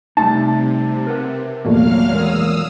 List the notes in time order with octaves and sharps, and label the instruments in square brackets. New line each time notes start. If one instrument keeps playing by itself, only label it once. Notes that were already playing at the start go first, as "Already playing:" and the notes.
[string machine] C3 [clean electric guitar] G3 A3 D#4 [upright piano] A5
[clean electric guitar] A#4 B4 F#5
[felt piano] A#1 E2 A3 [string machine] F#3 F5 F6 [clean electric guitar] A#3
[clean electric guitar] E3 G#3 A#4 [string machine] D#6 E6